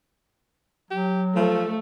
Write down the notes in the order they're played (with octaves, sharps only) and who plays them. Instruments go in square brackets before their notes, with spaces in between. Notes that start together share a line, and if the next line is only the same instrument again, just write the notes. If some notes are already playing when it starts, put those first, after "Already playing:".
[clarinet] F#3 [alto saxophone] G4
[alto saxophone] F3 [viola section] A3